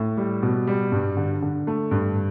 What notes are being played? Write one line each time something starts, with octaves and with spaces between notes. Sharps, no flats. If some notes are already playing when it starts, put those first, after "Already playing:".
Already playing: A2
G3
B2
G3
G2
D3
D3
A3
G2